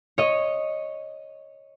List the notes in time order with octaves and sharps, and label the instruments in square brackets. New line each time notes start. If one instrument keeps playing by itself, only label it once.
[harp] C#5 D#5